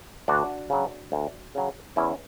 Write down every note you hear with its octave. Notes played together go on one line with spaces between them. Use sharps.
D2 D4 F#4
C#3 F#3
D2
C#3 F#3
E2 C#4 E4